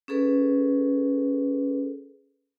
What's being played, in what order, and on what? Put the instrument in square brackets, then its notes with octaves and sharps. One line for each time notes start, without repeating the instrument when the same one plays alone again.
[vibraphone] C#4 G#4 A4 B4